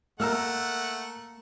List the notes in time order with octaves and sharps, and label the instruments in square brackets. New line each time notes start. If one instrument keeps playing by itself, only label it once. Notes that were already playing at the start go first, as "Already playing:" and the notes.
[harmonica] A3 F#5 [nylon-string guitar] A#3 [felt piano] A#5 E6 F6